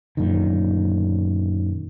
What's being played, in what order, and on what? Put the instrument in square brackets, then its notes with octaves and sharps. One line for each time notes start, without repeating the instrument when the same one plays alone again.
[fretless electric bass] F#2 A#2 D3 D#3